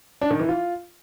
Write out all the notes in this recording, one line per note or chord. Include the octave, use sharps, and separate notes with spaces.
D4
D#3
E3
F4